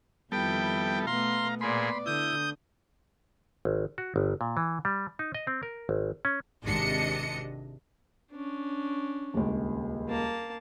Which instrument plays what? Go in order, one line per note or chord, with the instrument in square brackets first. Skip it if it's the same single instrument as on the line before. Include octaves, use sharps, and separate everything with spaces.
[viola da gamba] F2 D#3 E4 [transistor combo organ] G3 B3 A4 [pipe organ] G5
[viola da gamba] B2 A3 B3 [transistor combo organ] F5 A#5 [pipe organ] C6
[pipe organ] A#2 G#4 [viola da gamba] B3 D5 [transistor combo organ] B5 C6
[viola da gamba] D3 [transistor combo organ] E4 [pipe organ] D#6 G6
[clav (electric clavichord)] G#1
F#4
G1
A#2
E3
G3
D#4
D#5
C4
A#4
G#1
C#4
[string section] G#1 C3 D4 D#5 C#7
[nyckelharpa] C#4 D4
[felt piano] D#1 C#2
[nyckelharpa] A#3 A5